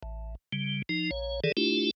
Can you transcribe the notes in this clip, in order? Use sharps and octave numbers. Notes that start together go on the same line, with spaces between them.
A1
C#3 G3
F3 D#4
A#1 C#5
D#3 E3 G#4 A4 D5
A3 D4 E4 F4 G4